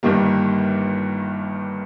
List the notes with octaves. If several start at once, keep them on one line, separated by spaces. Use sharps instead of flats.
G1 G2 D#3 G3 A#3